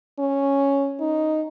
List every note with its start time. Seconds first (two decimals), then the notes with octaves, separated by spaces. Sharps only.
0.19 C#4
1.00 D#4